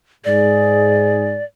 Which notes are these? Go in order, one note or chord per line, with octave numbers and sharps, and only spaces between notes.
G#2 G#4 D5